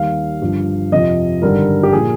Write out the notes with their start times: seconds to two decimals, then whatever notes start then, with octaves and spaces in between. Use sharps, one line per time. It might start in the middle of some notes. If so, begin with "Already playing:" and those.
Already playing: D#2 D#3 G3 F5
0.41 G1 G2 F3
0.92 F2 C3 F3 D#5
1.42 G#1 G2 D3 G3 A#4
1.83 G4
1.93 A#2 F3 G#4